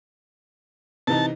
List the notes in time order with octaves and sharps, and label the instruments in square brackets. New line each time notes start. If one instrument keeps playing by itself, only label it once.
[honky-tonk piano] C3 E3 D#4 [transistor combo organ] A5